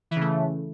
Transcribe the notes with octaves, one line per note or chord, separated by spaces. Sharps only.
C#3 E3 A3